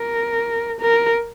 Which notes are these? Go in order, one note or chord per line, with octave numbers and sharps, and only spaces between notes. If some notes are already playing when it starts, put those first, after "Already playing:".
Already playing: A#4
A#4